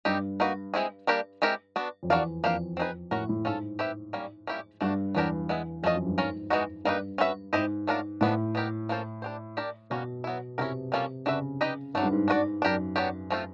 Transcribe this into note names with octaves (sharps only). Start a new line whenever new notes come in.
G2 G3 C4 D#4 G4
A#3 D#4 F#4 B4
G#3 C4 E4 G#4
G3 A#3 D4 G4 A#4
G#3 C4 E4 G4 A#4
B3 D4 F#4
F2
E2 D4 F#4 A#4 D5 F5
F2 A#3 D4 G4 C5 F5
C4 D#4 G#4 B4
A2 C#4 F#4 A#4
A2
G#2 C#4 F4 A4
C4 E4 G4 B4 E5
G3 A#3 C#4
G3 A#3 C#4 E4 G4
G2 A3 D4 F#4
E2 F#3 B3 D4 G4 A#4
G#3 B3 E4
F2 A3 C#4 F4 A#4 D#5
F#2
G2
G#2 C#4 F4 A#4
E3 G#3 B3 D#4 F#4
G2 G3 A#3 D#4 F#4 B4
C#4 F#4 B4 E5
G#2 C4 E4 G4 C5 D#5
F#3 A3 D4 F4 A#4
A2 F3 G#3 B3 D4
B3 D#4 G4 A#4
A#3 C#4 F4 A4 C5
D4 G4 C5
D4 G4 A#4 D5
B2 G3 A#3 C#4 F#4
F#3 B3 E4
C3 C#4 E4 G4 A#4
G3 A#3 C#4 F4 A4
C#3 D4 F#4 B4 E5
D#4 G4 B4 D#5
G#2 F#3 A3 D4
G2
G#2
D4 F#4 B4 D5
F#2 D4 G4 A#4
F#3 B3 D4 G4
F3 A3 C4 F4